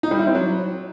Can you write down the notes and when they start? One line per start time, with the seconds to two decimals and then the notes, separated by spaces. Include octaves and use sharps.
0.03 D#4
0.11 G3
0.19 E4
0.27 C4
0.35 F#3